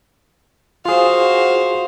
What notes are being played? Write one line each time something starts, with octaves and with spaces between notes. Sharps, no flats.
F4 F#4 G#4 C5 F5